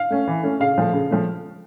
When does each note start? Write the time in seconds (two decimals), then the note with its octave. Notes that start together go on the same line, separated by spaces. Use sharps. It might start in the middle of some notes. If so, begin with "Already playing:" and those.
Already playing: F5
0.11 A3 C#4
0.27 E3
0.43 A3 C#4
0.60 C#3 F5
0.78 F3 A3
0.93 C#3
1.11 F3 A3